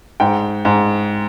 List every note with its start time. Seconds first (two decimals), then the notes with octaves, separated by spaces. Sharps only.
0.20 G#2 G5
0.65 G#2